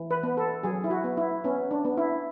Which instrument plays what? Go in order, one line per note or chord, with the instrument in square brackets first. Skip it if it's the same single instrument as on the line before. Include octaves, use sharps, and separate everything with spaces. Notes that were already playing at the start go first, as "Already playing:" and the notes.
Already playing: [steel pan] E3
B4
B3
A4
F#3 G#4
E4
F#4
B3
E4
B3 C#4
D4
B3
E4